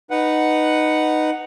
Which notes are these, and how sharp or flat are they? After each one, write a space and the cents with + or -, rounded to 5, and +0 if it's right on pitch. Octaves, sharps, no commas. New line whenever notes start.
D#4 -10 B4 +0 F#5 +0